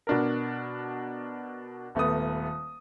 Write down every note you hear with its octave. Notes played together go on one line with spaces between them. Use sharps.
B2 D4 A#4
D#1 A3 B3 D#6